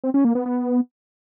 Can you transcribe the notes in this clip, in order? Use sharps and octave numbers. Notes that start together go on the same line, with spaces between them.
C4
C#4
A#3
B3
B3